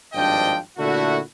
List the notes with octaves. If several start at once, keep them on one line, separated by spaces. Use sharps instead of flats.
G#1 G2 F3 D4 D#5 G5
A#2 D3 A3 E4 F#4